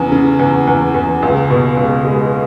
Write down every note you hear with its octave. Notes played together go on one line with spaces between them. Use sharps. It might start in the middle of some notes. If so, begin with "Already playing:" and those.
Already playing: E2 C#3
C#3
E2
E2
E2
C#2
B2
C#2
G#3